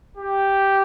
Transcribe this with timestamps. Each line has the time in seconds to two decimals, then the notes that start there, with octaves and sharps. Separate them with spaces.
0.17 G4